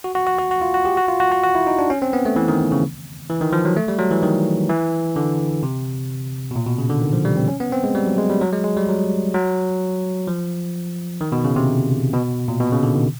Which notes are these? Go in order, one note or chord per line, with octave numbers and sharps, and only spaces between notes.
F#4
F#4
F#4
F#4
F#4
F4
F#4
G4
F#4
F4
F#4
F#4
F#4
E4
D#4
D4
C#4
C4
B3
A3
E3
D#3
C#3
E3
D#3
F3
F#3
A3
G3
F#3
E3
D#3
E3
D3
C3
B2
A#2
B2
C#3
D3
D#3
F3
G3
C4
C#4
B3
C4
G#3
G3
F#3
G#3
G3
F#3
G#3
G#3
G3
F#3
F#3
F3
D#3
B2
C#3
C3
B2
A#2
B2
C#3
D3
D#3